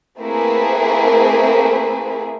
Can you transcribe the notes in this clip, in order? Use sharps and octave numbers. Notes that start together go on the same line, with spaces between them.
A3 A#3 C4 E4 G#4 B4